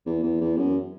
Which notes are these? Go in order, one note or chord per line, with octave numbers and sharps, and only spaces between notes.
E2
E2
E2
F#2